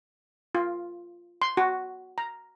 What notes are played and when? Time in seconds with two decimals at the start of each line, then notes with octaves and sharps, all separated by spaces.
0.55 F4
1.42 C6
1.57 F#4
2.18 A#5